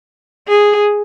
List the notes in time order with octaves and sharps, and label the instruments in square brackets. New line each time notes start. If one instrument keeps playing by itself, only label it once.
[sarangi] G#4